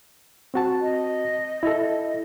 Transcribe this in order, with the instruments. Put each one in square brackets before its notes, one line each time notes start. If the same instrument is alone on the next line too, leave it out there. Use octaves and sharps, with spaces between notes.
[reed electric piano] C4 F#4 A5
[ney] D#5
[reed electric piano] E4 A4